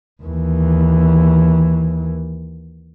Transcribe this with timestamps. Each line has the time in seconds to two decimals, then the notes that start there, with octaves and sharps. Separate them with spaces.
0.23 D#2 E3